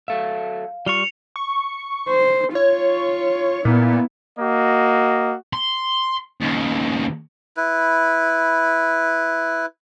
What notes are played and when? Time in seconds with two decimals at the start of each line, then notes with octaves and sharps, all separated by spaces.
0.08 F#3 A4 E5 F5
0.86 G3 F4 C#6 C#7 F7 G7
1.36 C#6
2.09 C5
2.55 F4 C#5
3.65 A#2 B3 E4
4.39 A#3 F#4 D#5
5.53 C6
6.40 D#2 C#3
7.57 E4 B4